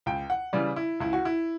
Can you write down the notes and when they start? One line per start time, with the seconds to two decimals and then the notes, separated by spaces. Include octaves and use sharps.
0.06 C#2 G5
0.30 F#5
0.53 C#3 E3 G3 D5
0.76 E4
1.00 C#2 E4
1.13 F#4
1.25 E4